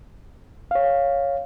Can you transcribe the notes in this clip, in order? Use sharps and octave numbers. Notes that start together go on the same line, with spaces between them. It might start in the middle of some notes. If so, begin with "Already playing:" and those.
C#5 F5